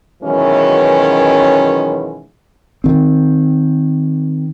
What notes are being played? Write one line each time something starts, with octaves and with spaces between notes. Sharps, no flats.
F#2 B2 D#3 E3 G#3 C#4
D#3 C4